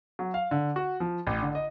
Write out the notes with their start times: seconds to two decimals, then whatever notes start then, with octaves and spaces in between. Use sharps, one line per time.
0.19 F#3
0.34 F5
0.51 D3
0.76 F#4
1.00 F3
1.27 A1
1.42 D3
1.55 D#5